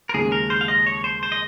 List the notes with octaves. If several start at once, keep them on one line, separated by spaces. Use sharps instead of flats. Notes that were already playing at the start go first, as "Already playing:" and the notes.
A#4
D#2 C#3 F3 G#3 G#4
A#4
C5
F5
D#5
C#5
C5
C5
D#5